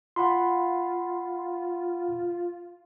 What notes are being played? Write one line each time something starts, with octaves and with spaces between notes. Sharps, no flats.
F4 F#5 B5 C6